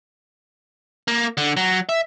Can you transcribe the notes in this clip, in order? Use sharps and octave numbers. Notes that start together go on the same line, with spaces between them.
A#3
D3
F#3
E5